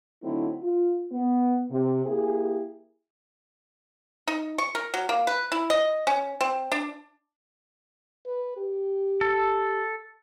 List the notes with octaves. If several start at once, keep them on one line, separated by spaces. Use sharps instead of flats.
D3 F#3 A3 C4 D#4 E4
F4
B3
C3
A#3 E4 G4 G#4
D#4
C#6
A#4
F#3
A#3
B4
E4
D#5
C#4
C4
D4
B4
G4
A4